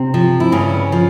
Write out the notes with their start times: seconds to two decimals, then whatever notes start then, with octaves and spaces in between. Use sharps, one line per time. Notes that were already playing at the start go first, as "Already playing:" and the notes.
Already playing: C3 C4
0.14 F3
0.40 E4
0.52 G2 C#3 C#4
0.92 F3